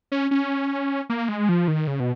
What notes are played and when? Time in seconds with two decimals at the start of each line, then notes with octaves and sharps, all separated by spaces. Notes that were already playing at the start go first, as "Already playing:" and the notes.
0.12 C#4
0.31 C#4
1.10 A#3
1.28 G#3
1.49 F3
1.68 D#3
1.87 C#3
2.00 B2